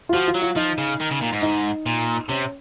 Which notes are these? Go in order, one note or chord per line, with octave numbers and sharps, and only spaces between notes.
F4
F3 F#4
F4
F#3
F4
F3 D#4
C#3
D#3
C#3
A#2
G#2
D#4
A#2
C3 C#4